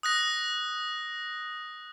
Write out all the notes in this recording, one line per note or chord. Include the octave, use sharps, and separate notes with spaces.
D#6 F#6 A#6